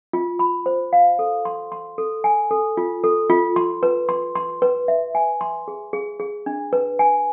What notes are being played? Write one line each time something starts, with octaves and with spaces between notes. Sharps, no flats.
F4
B5
C5
F5
A4
C6
C6
A4
G#5
A4
F4
A4
F4
C6
B4
C6
C6
B4
E5
G#5
C6
G#4
G#4
G#4
D4
B4
G#5